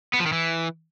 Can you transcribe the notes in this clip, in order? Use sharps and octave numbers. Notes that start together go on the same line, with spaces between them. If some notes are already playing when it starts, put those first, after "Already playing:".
B3
F3
D#3
E3